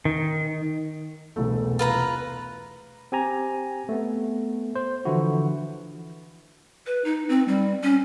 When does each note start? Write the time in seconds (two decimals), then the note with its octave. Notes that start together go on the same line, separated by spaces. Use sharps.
0.05 D#3
1.36 E1 C2 A3
1.79 F4 B4 A#5
3.12 C4 G4 G#5 A#5
3.89 A3 B3
4.75 C5
5.05 D3 E3 F3 E4 F#4
6.87 B4
7.04 D#4
7.29 C4
7.48 G3
7.83 C#4